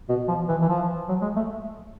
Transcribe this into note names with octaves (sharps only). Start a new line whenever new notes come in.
B2
F3
E3
E3
F3
F#3
G#3
A3